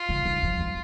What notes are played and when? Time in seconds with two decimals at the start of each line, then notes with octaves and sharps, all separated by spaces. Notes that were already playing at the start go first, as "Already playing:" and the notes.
Already playing: F4
0.09 C#3
0.25 D#3
0.43 F3
0.60 F#3